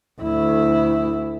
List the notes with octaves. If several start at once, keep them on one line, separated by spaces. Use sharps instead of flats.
D2 E4